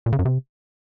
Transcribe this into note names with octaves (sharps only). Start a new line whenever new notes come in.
A#2
C#3
F#2
C3